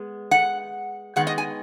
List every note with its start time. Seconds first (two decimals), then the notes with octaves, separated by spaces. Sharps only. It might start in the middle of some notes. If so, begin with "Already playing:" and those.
Already playing: G#3 B3
0.31 F#5
1.16 D#3 G#3 B3 F#5
1.27 D#5
1.38 G#5